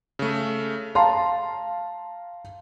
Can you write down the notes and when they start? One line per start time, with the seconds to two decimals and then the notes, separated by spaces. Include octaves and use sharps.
0.19 C#3 A3
0.95 F5 A5 A#5 C6